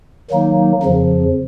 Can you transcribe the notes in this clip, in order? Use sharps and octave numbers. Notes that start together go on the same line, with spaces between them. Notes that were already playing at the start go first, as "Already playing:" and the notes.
D#3 F#3 A#3 D#4
F2 C#3 F3